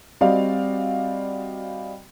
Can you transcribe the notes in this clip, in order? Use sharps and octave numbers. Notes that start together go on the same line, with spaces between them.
G3 C4 F#4 D5 D#5 F5